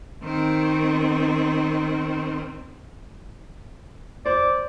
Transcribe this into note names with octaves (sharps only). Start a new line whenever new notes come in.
D#3 C4
C5 D5